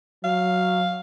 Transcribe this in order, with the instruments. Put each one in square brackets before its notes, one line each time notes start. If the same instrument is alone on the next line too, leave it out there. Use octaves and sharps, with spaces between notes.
[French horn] F#3 [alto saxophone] F5